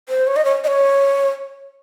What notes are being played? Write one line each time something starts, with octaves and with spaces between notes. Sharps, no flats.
C5
C#5
D#5
C#5
D#5
C#5